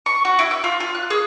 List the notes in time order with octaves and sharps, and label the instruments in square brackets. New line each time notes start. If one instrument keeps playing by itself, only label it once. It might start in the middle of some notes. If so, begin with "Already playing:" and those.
[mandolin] C#6
F#4
E4
E6
F4
F4
F#6
G#4